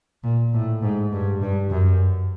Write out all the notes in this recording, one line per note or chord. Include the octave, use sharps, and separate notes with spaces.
A#2
A2
G#2
G2
G2
F#2